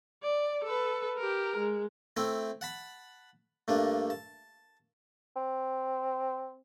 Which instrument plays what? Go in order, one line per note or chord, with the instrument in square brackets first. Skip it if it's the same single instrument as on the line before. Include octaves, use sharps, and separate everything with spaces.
[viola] D5
A4 B4
G4 A#4
G#3
[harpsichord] A3 C4 E4 G5
F#5 A5 B5
G2 A3 A#3 D4
A5
[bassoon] C4